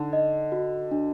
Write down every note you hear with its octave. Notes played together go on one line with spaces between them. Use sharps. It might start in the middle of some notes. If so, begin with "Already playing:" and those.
Already playing: D3 D#4
D#5
F#4
D4